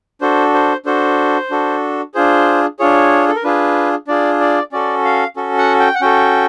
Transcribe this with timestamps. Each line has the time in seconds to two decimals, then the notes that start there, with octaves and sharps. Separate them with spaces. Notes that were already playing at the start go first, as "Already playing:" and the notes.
0.21 D4 F#4 A4 C5
0.54 C5
0.86 D4 F#4 A4 C5
1.50 D4 F#4 A4
2.14 D4 F4 G#4 C5
2.79 D4 F4 G#4 C#5
3.28 A4
3.36 A#4
3.44 D4 F4 G#4 B4
4.07 D4 F4 G#4 D5
4.40 D5
4.72 C#4 F#4 A4 D5
5.05 F5
5.36 C#4 F#4 A4
5.58 F#5
5.80 G5
5.95 F#5
6.01 C#4 F#4 A4 G5